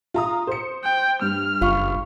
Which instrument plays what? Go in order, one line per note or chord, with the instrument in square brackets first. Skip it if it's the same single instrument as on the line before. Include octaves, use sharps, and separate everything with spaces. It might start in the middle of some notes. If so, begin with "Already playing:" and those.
[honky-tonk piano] F4 A#5 D#6
C5 C#7
[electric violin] G5
[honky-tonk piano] G2 [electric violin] F6
[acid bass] F#1 [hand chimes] F4 F5 C#6